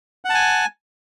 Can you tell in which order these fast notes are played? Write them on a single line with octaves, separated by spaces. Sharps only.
F#5 A5 G#5